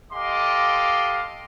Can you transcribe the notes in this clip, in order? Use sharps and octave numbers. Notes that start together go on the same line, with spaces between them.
G4 A4 D#5 F5 C6 D6